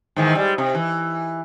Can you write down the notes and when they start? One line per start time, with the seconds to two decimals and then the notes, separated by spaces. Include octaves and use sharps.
0.16 G#2 D#3 E3
0.35 G3 G#3
0.58 C3
0.75 E3